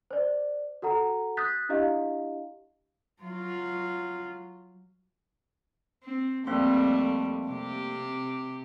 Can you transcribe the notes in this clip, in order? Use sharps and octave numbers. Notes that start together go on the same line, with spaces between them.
C5 D5
F#4 A4 F#5 A#5
D#6 F#6 G6 A6 B6
D4 E4 G4 D#5 F5
F#3 F4
C4
F2 G3 A3 A#3 C4 C6
C3 G4